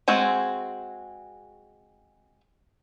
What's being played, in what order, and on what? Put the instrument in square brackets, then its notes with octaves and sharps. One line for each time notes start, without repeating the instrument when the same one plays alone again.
[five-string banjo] G#3 C4 F#4 G#4